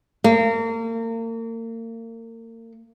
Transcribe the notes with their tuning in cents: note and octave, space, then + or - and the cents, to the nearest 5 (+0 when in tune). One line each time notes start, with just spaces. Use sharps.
A#3 -35